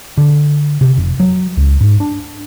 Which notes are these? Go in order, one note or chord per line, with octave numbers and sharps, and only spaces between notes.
D3
C3
F1
F#3
C#2
G#2
D4